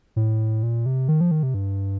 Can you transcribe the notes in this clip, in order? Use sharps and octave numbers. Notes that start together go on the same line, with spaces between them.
A2
A#2
C3
D#3
F3
D#3
C3
G2